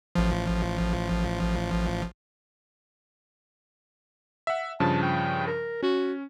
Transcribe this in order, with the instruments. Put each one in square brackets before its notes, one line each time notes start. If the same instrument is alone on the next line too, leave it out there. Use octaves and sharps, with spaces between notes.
[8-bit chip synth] A1 F3
[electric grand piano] E5 F#5
[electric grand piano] G2 C#3 F3 [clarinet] A5
[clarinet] G5
A#4
[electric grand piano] C#4 [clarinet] F#4